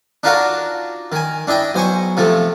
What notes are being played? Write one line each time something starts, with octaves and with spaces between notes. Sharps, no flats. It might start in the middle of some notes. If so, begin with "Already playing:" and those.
D4 D#4 F4 F#4 A#4 A5
D#3 G#5
D4 E4 D#5 G5
B1 C5 G#5 C#6
C3 F3 A3